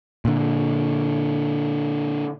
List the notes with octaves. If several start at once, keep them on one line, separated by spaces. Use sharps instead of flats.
A#2 D3